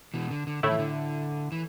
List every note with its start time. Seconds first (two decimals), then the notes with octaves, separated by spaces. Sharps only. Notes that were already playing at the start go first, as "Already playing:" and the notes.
0.14 B2 E3
0.31 D3
0.47 D3
0.63 A2 D3 A3 E4
0.71 E3
0.79 D3
1.52 E3